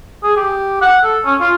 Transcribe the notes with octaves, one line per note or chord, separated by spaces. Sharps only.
G#4
G4
F#5
A4
C#4
F4